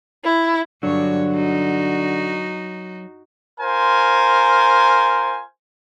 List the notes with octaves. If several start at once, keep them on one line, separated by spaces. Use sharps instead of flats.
E4
G2 D3 F#3 C#5
D#4 F#4
F4 A#4 C5 G#5